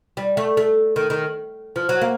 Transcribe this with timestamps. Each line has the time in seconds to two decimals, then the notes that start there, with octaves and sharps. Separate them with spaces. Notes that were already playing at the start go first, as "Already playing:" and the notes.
0.17 G3
0.37 A3
0.57 A3
0.96 D#3
1.10 D#3
1.76 F3
1.89 F#3
2.01 A#3